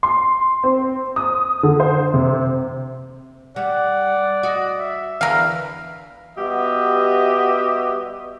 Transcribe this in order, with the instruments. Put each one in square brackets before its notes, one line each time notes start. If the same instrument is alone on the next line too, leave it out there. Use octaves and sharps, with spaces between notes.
[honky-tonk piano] C6
C4
D#6
D3
C5
C3
[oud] G3 [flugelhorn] D5 [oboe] F#5
[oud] F#4 [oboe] D#5
[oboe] E5
[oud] E2 D3 E3 [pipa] A#4 F5
[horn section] G3 B3 F#4 G4 D#5 E5